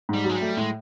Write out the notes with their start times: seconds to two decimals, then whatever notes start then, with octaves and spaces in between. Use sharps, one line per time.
0.09 G#2 G3
0.24 F#3
0.30 G#3
0.35 G3
0.41 A3
0.57 A2 G#3